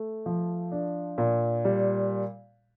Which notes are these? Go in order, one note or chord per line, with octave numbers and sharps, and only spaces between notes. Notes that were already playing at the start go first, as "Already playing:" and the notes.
Already playing: A3
F3
D4
A#2
G3